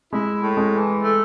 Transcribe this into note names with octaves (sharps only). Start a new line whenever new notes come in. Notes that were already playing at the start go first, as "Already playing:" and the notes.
G#3 E4
A2
G#3
E3
A3